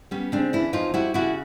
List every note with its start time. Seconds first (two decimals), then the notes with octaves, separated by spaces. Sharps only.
0.11 G3 B3 C#4
0.32 C#3 C4 D4
0.53 E3 D4 E4
0.73 F2 D#4 F4
0.94 G3 E4 F#4
1.14 C#3 E4 F#4